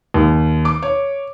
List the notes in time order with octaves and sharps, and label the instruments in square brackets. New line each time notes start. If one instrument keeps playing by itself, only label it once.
[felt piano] D#2
D6
C#5